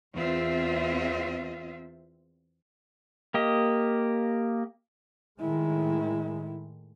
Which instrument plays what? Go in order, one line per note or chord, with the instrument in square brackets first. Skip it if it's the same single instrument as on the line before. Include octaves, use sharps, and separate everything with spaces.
[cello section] E2 C4 F4 E5
[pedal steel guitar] A#3 G4 D#5
[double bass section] A2 D#3 G#3 [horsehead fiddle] E4